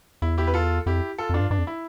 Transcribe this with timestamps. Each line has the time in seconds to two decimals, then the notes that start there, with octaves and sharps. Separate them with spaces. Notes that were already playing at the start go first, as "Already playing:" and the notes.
0.22 E2 E4
0.38 E4 G4
0.47 B4
0.54 F4 A4
0.86 F2 E4 G4
1.18 F4 A4
1.29 F2 D4 F4
1.40 G2
1.50 G2 D4
1.58 F2
1.67 E4